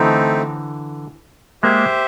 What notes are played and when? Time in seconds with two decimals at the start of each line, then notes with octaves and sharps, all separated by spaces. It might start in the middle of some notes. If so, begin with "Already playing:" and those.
Already playing: D3 E3 A3 C4 D#4
1.63 G#3 A#3 G4 C5 E5